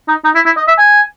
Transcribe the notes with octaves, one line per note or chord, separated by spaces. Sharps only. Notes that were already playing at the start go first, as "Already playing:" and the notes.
D#4
D#4
E4
E4
D#5
E5
G#5